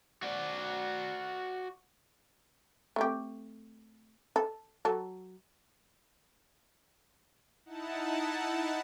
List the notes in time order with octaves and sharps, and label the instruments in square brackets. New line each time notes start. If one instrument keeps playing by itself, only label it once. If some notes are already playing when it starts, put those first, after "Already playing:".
[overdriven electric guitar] F#4 D5
[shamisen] A3 C4 G4
A4
F#3 A4
[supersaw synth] D#4 E4 F#5 A5